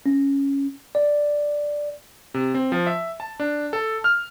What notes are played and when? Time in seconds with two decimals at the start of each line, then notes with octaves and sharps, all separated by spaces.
0.06 C#4
0.95 D5
2.34 C3
2.54 C4
2.72 F3
2.87 E5
3.20 A5
3.40 D4
3.73 A4
4.04 F6